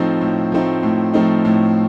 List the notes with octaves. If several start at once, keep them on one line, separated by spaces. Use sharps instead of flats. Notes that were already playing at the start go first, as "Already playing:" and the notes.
Already playing: A2 F3 A3 C4 D#4
A2
F3 A3 C4 D#4
A2
F3 A3 C4 D#4
A2